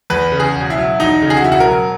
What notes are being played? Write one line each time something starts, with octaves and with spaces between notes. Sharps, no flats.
E2 B4
C#3
G#4
E1
E4
F#3
E2 D#4
C#3
G#4
F#4
E1 E4
F#4
A#4
F#3